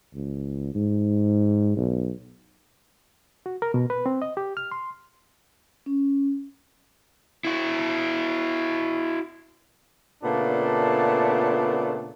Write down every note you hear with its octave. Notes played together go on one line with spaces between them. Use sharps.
C#2
G#2
B1
F#4
A#4
B2
B4
C4
D#5
G4
F6
C6
C#4
E4 F#4
A#2 C#3 A3 B3 D4